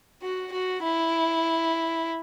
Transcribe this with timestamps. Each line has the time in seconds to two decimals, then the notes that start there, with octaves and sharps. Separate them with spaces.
0.22 F#4
0.52 F#4
0.83 E4